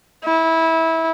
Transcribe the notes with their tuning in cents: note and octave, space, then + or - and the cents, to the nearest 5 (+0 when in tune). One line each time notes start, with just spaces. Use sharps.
E4 -20